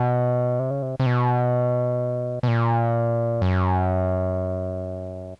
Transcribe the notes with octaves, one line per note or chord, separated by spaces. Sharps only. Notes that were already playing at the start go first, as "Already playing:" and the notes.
Already playing: B2
C3
C#3
C3
C3
B2
B2
A#2
F#2